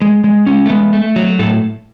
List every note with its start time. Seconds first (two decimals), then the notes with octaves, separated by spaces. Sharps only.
0.02 G#3
0.24 G#3
0.46 G#3 C#4
0.66 A3
0.70 G#3 B3
0.93 A3
1.16 F#3
1.39 A2 A4